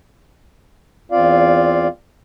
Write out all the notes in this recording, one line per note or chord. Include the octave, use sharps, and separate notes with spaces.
E2 C4 F4 D5 F5